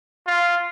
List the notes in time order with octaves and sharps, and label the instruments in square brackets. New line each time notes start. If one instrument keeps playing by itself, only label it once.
[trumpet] F4